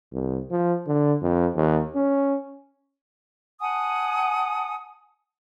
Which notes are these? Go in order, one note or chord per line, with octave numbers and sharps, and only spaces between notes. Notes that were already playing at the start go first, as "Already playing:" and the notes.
C2
F3
D3
F2
D#2
C#4
F#5 G#5 A5 D#6